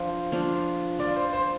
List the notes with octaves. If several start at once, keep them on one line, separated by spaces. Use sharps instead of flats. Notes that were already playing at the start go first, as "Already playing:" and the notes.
Already playing: F3 D4 F4 C5
F3 D4 F4
F3 D4 F4 D5
C5
C5